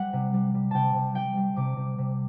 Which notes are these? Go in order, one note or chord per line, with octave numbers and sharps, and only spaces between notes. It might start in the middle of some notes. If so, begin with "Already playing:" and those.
Already playing: G3 F#5
C3
G3
G3
C3 G5 A5
C3
G3 G5
G3
C3 D6
C3
C3